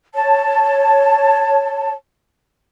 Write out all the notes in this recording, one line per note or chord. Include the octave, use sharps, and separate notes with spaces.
C#5 A5